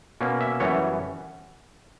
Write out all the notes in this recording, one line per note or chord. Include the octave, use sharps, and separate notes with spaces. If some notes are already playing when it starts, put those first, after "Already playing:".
B2 A#3 C#4
E5
F#2 E3 G3 B3 C#5